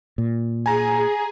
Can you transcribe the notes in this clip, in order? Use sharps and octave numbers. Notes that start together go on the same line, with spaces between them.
A#2
G#4 G#5 A#5